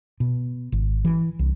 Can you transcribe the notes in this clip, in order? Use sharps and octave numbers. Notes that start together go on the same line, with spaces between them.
B2
G#1
E3
C2